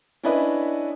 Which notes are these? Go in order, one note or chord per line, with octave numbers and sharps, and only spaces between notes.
C#4 D4 E4 B4 D#5